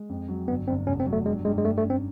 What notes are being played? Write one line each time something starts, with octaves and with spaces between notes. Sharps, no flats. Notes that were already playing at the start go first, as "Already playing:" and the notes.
Already playing: G#3
F2
F#3
G1 B3
G1 C4
F1 C#4
C4
F#3
A3
G2 G#3
G2 G#3
G#3
G2 A3
A3
C#4
C4